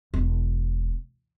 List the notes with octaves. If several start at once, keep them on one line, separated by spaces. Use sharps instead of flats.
E1